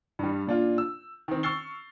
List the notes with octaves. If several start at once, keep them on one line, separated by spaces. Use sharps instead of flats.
G2 G3
A#2 D4 F4
E6
D#3 C4
C#6 E6 F6 A6 C7 G7